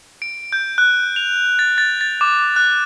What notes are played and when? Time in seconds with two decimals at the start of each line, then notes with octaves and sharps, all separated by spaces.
0.22 D7
0.53 G6
0.78 F#6
1.16 F7
1.59 A6
1.78 A6
2.01 A6
2.21 D6
2.56 F#6